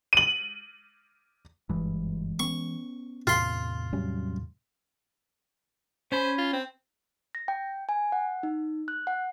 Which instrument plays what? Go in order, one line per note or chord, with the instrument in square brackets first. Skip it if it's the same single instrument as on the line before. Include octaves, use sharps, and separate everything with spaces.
[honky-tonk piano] D#7 F#7
[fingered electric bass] F#1 G2 [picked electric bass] E3 G#3
[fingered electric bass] B3 C#4 [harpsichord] C#6
[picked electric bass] E2 A2 C3 [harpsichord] F4 C6
[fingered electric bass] F#3 G3 C#4
[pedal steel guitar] C#4 G#5 B5 [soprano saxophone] C5
[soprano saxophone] F4
C4
[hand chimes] A#6
G5
G#5
F#5
D#4
F#6
F#5